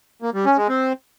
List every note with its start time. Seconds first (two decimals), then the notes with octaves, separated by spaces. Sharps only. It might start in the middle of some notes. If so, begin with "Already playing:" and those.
0.22 A#3
0.34 G3
0.46 C#4
0.57 G#3
0.69 C4